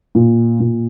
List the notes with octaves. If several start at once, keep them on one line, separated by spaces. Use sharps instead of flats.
A#2
A#2